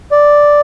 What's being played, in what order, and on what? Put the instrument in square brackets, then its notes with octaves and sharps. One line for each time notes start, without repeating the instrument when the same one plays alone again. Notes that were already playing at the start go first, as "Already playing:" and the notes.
[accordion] D5